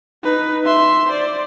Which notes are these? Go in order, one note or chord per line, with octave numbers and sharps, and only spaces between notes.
D#4 B4
E5 C6
C5 D5